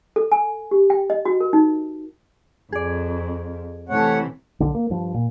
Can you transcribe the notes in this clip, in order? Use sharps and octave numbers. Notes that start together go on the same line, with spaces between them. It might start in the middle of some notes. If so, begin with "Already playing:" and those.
A4
G#5
G4
G5
D#5
F#4
A#4
D#4
F2 G#4 D5
C3 E3 A3 C#5 F#5
B1 D3
A#3
G2 F3
A#2